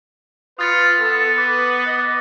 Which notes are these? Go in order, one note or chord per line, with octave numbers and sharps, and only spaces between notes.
F4 B4 D#6 A6 C#7
B3 A4
B4 D6
D#5